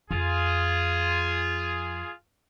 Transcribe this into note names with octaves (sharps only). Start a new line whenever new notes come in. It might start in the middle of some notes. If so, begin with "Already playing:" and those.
F2 F4 G#4